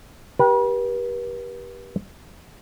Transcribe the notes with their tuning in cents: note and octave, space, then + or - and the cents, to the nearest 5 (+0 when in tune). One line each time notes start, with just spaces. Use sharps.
G4 -5 B4 -40